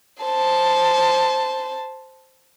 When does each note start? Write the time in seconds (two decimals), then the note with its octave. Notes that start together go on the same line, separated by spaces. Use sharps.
0.23 C5 A5